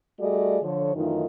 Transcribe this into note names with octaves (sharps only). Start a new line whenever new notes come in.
G3 A3 F#4 G#4 D5 D#5
D3 F3 C#5
F#2 D#3 E3 A3 D#4 F4